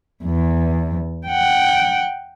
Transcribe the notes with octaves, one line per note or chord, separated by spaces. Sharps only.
E2
F#5 G5